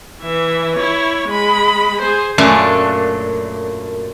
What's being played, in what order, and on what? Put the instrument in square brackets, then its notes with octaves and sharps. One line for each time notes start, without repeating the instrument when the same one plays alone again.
[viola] E3 E5
E4 C#5
G#3 B5
G#4 C5
[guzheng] F#2 A#2 A3 D4